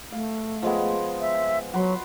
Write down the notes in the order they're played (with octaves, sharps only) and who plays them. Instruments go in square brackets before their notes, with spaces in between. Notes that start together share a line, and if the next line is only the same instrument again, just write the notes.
[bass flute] A3 [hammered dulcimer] F5
[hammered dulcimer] F3 G#3 B3
[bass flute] E5
[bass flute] F#3 [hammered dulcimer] F#4 B5 C6